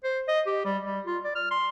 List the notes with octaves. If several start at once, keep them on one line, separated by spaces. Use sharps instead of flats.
C5
D#5
G4
G3
G3
F4
D5
F6
C6